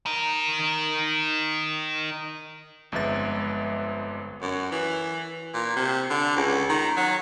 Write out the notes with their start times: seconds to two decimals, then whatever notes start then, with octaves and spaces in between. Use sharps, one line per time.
0.06 D#4 A#4
2.92 G1 F2 G#3 B4 E5 A6
4.42 F#2
4.72 E3
5.54 A#2
5.76 C3
6.10 D3
6.36 C#2
6.69 D#3
6.97 F#3